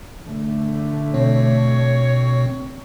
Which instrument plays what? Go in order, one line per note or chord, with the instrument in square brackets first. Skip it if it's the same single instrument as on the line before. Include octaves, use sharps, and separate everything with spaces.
[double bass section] D3 A3
[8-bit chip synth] B2 C4 [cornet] C#5